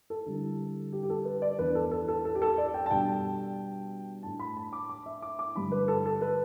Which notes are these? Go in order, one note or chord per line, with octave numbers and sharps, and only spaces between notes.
A4
D3 G3 E4
G4
G4
A4
B4
D5
E2 E3 B3 D4 B4
A4
A4
A4
A4
G4
A4
D5
G5
A5
B2 G3 D4 G5
A2 A3 D4 A5
B5
A5
D6
D6
E5
D6
D6
G2 D3 G3 D4 B5
B4
A4
A4
B4